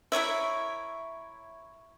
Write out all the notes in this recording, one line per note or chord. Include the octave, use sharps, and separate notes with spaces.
E4 A#4 C#5 E5